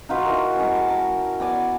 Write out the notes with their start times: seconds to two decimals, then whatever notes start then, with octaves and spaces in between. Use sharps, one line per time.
0.09 D#4 F4 F#4 B4
0.25 E3 A#4
0.56 G#3 C#4 C#5
0.75 A5
0.90 A#4
1.40 B3 D5 G#5